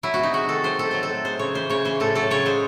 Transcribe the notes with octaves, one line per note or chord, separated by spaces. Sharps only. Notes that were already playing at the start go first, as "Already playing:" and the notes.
F#3 E4
F#4
C3 D#4
G#3 F#4
D#3 A4
F#3 C5
C3 A4
F#3 C5
A4
A2
G#3 C5
C#3 C#5
E3 C5
C#3 C#5
E3 C5
A2 A4
F#3 A4
C#3 C#5
G#3 C5